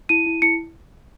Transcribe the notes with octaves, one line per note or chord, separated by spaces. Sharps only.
E4 D#7
E4
E4 C#7